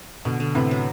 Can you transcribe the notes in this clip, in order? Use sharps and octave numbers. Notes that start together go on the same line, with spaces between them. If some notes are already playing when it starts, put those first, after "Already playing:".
B2 D3
D3
A2 C3 B3
F#3